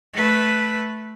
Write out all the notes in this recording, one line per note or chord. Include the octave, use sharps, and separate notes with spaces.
A3 B4